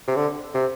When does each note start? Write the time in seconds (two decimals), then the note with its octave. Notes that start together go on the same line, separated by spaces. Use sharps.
0.08 C3
0.16 D3
0.54 C3